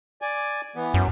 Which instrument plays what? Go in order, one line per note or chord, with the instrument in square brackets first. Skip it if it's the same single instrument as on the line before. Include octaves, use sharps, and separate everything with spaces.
[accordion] D5 G#5
E3 B3
[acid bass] F#2